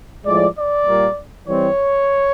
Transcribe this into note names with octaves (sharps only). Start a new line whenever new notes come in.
A2 F3 G#3 D5
D5
A#2 G3 A#3
E3 G3 C4 C#5